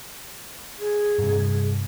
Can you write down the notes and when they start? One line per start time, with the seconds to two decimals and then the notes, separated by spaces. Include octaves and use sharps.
0.79 G#4
1.18 G2 C3